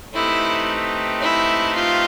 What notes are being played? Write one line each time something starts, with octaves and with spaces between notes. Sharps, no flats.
A3 C4 D#4 E4 G4 B4
E4
F4